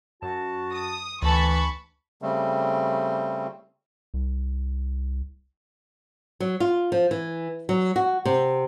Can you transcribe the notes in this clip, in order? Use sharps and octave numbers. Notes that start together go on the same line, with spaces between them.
F#2 F#4 A5
D#6
D2 E3 A5 B5 C#6
C#3 G3 A3 C4
C2
F#3
F4
F3
E3
F#3
F#4
C3